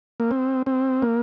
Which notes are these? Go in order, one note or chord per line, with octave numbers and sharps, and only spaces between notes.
A#3
C4
C4
A#3